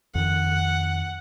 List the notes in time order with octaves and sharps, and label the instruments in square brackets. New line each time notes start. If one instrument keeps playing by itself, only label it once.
[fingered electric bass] F2 D#3 [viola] F#5